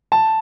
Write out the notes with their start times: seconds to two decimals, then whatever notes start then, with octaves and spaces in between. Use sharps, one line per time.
0.12 A5